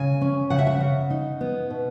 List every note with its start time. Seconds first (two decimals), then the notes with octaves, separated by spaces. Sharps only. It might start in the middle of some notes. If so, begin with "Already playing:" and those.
Already playing: C#3 G#5
0.21 C#4
0.50 C#3 F#5
0.59 E5
0.67 F#5
0.81 C#3
1.10 D#4
1.41 B3
1.70 B2